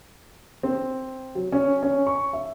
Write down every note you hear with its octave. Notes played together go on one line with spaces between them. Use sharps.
C4
F#3
C#4
C#4
C#6
E5